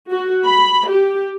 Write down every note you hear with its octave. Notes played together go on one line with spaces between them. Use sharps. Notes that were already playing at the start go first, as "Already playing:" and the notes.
F#4
B5
G4